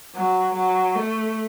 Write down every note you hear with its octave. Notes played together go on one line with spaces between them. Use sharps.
F#3
F#3
A3